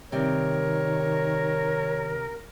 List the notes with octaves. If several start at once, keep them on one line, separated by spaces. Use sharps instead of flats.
C3 D#3 G3 A#4 C#5